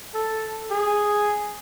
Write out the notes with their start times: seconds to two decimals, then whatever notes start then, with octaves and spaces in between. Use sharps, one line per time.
0.14 A4
0.71 G#4